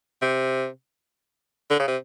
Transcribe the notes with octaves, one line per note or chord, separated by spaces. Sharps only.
C3
D3
C#3
C3